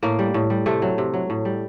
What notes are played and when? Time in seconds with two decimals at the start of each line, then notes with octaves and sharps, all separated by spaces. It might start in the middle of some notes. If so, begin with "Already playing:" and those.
0.03 A2 A#3
0.19 G3
0.34 A2
0.50 G3
0.66 C3 A3
0.82 F#3
0.98 C3
1.14 F#3
1.30 A2
1.45 G3